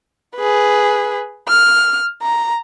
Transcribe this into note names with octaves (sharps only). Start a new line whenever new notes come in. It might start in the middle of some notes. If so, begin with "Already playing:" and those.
G#4 B4
F6
A#5